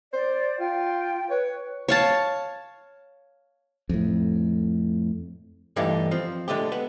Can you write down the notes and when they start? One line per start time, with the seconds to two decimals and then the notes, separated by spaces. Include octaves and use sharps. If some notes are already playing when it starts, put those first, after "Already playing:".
0.13 C5 D5
0.60 F4 G5
1.30 B4 C#5
1.88 C#5 F5 A5
3.89 F2 A2
5.76 G2 E3 A3 D4 D#4 G4
6.11 F3 C4
6.48 D3 G#3 A3 G4
6.72 B3